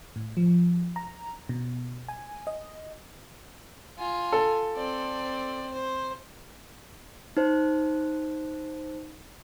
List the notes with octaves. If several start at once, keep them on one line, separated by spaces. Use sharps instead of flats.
A2
F3
A#5
B2
G#5
D#5
F4 G#5
A4
C4 D5
C5
D#4 C5